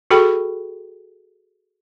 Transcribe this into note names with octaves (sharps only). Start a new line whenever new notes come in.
F#4 G#4 A4 G5 B5 C#6